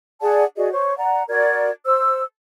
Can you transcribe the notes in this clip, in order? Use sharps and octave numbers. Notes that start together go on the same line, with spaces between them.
G#4 D5 F#5 A5
F#4 G#4 D5 D#5
C5 C#5 C#6
D5 F#5 A#5
F#4 A#4 D5 G#6
C5 E6